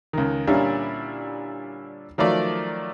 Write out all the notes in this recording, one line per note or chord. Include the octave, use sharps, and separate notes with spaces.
C#2 D#3
A#2 D3 G3 C#4 D4 E4
D#3 F3 F#3 A3 D5